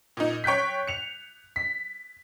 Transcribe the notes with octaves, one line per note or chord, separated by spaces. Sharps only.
A#2 D#4
C#5 G5 F#6 G6 B6
C#7 F7
B6